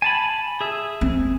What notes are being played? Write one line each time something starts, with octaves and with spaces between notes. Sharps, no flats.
G#5 A5 B5
G#4 E5
C4